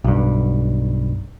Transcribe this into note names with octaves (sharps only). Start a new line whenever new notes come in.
B1 G2